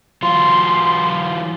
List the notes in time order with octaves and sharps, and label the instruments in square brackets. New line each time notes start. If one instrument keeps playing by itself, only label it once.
[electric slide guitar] E3 F#3 F4 [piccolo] C6